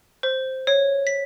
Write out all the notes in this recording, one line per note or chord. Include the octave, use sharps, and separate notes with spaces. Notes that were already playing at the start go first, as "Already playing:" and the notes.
C5
C#5
B6